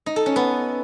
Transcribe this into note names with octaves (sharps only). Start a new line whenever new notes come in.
D#4
A4
C#4
B3